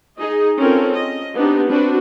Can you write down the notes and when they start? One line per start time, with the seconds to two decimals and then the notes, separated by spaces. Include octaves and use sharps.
0.19 D#4 G#4 D#5
0.59 C4 C#4 F4 A4 A#4
0.95 D#5
1.35 B3 C4 D4 D#4 G4
1.70 C4 D4 F#4 B4